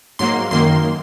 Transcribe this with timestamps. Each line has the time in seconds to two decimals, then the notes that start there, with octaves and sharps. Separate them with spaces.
0.19 G#2 F#3 A#3 C6
0.51 F#2 D#3 A#3 C6